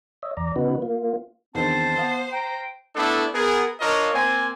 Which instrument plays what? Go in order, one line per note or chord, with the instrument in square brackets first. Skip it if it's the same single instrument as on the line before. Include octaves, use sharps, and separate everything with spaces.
[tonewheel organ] C#5 D#5 E5
E2 D5 A#5
C#3 B3 D#4 F#4 B4
A#3 F4
[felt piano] E2 D3 D#3 [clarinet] C4 [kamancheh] C5 [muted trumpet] A5
[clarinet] B3 [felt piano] F5
[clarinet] G5 [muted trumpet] A#5
[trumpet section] A3 B3 D4 E4 A4
B3 G#4 A#4
D4 F4 A#4 C#5 D#5 F5
A#3 C4 G#5